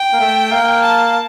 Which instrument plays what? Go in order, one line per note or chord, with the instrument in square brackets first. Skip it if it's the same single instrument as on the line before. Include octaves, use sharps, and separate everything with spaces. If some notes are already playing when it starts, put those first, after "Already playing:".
Already playing: [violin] G5
[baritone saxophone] A#3
A3
A#3
[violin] A5